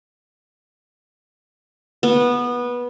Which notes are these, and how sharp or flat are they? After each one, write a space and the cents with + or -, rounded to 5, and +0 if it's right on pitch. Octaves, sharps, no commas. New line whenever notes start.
B3 -15